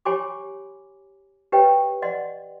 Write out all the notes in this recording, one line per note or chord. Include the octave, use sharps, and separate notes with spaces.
G4 C#5 G#5 B5 C6 D6
G4 B4 C#5 D#5 G5
D5 D#5 F#5 C6